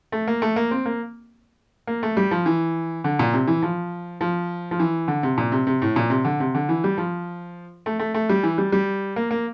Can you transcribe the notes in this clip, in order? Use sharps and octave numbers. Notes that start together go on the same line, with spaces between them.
A3
A#3
A3
A#3
C4
A#3
A#3
A3
G3
F3
E3
D3
A#2
C3
E3
F3
F3
F3
E3
D3
C3
A#2
C3
C3
A2
A#2
C3
D3
C3
D3
E3
G3
F3
A3
A3
A3
G3
E3
G3
G3
A#3
A#3